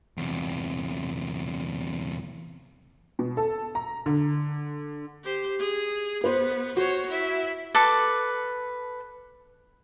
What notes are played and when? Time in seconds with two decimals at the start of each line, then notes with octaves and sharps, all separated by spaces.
0.17 E2 C3
3.19 B2
3.37 A4
3.75 A#5
4.06 D3
5.23 G4 C5
5.59 G#4
6.24 B3 B4 C5
6.77 F#4 C5 C#5
7.10 E4 E5
7.75 A4 B4 D6